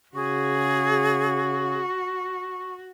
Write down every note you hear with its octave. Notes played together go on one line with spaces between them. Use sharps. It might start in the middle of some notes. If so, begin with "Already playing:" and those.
C#3 F#4 G#4 C#6